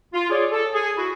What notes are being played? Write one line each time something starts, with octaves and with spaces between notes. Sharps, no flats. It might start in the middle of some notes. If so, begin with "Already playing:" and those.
F4
G#4 C#5 D5
A4
G#4
E4 F#4